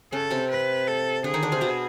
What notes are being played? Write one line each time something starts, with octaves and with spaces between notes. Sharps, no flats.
C#3 C#4 A4
C3 C4
B4
A4
D3 D4 G#4
D#3 D#4
D3 D4
C3 C4
B2 B3